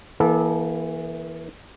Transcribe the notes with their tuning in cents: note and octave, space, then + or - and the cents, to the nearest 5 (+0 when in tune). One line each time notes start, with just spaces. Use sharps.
E3 +0 A#3 +35 A4 -25